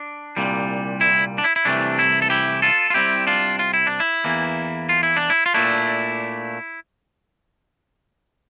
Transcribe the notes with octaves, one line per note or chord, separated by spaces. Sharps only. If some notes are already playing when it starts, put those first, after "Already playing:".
Already playing: D4
C2 A#2 G3
E4
D4
E4
E4
C2 C3 E3 A3 D4
E4
A4
E4 G4
F4 A4
F4
C2 C3 G3 C4 E4 G4
D4 F4
F4
E4
D4
E4
E2 E3 A#3
F4
E4
D4
E4
F4
A#2 A3 D4 E4